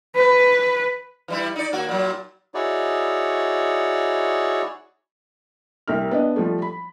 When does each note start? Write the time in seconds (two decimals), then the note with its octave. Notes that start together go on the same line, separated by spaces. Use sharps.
0.16 B4
1.28 E3 G3 E4
1.56 D#4 D5
1.72 D#2 A#3 F#4
1.89 A#2 F#3
2.54 D#4 E4 F#4 G#4 C#5 D5
5.88 C2 A#4 F6
6.11 B3 D4 D#5
6.36 F3 G3 A3
6.62 B5